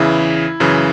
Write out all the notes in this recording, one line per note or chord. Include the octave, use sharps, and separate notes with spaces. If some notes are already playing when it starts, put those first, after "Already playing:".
Already playing: E2 C#3 E3 E4
F#2 C#3 E3